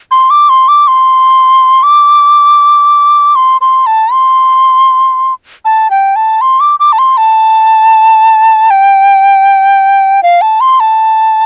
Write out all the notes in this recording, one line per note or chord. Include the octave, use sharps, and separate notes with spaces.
C6
D6
C6
D6
C6
D6
C6
C6
A5
C6
A5
G5
A5
C6
D6
D6
A5
C6
A5
G5
F5
A5
C6
A5